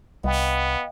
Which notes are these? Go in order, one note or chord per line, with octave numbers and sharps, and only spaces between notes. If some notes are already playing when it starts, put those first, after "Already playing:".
C2 B3 D#5 F5 G5